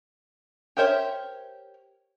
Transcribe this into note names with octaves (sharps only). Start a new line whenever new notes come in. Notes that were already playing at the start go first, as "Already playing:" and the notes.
G4 A#4 C5 C#5 E5